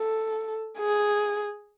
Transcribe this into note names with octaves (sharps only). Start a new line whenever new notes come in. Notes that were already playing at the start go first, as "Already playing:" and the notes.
Already playing: A4
G#4